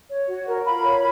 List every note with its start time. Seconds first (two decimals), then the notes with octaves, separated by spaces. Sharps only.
0.09 C#5
0.28 F#4
0.46 A#4
0.65 F4 B5
0.84 C#5